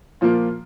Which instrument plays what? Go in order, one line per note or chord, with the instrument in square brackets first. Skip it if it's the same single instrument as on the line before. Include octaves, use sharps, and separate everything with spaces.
[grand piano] A#2 F3 A#3 F4